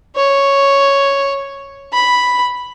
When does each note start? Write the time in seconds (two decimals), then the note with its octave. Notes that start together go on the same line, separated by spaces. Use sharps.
0.16 C#5
1.93 B5